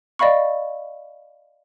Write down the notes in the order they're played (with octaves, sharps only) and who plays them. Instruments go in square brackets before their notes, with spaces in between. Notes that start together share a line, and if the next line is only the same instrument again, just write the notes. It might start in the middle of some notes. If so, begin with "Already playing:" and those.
[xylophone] D5 D#5 F5 B5 C#6